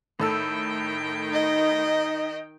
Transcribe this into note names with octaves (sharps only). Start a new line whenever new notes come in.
A2 D#3 A4 G5 E6
D#4 D#5